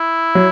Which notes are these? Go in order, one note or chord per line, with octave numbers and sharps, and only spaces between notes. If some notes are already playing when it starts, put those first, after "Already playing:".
Already playing: E4
F#3